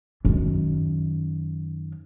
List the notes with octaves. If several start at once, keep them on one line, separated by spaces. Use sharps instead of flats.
F#2 D#3